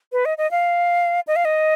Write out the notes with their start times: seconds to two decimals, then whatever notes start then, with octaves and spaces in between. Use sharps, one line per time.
0.12 B4
0.25 D#5
0.38 D#5
0.51 F5
1.27 D#5
1.36 F5
1.45 D#5